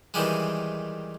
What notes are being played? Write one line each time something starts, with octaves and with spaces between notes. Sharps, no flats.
D#3 E3 G3 G#3